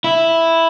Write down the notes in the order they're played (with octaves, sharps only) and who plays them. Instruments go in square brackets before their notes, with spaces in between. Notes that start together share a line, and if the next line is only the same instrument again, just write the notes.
[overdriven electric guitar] E4